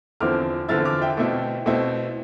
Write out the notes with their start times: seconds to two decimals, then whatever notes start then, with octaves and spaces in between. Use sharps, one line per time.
0.20 E2 D3 F3 C4 E4 D6 F6
0.68 E2 D3 F3 C4 E4 F6 A6
0.85 D6 F6
1.02 E5 G5
1.17 B2 A3 C4 E4
1.66 B2 A3 C4 E4